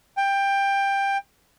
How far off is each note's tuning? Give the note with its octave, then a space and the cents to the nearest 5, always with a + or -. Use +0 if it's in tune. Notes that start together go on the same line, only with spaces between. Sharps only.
G5 +15